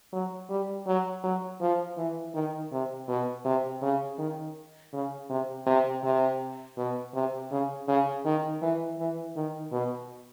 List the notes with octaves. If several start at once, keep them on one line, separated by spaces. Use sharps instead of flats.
F#3
G3
F#3
F#3
F3
E3
D#3
C3
B2
C3
C#3
D#3
C#3
C3
C3
C3
B2
C3
C#3
C#3
D#3
E3
E3
D#3
B2